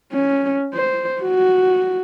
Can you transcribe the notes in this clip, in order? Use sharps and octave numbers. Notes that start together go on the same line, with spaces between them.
C#4
C5
F#4